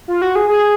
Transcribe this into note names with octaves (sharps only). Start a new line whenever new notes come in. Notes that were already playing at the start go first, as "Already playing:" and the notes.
F4
F#4
G#4
G#4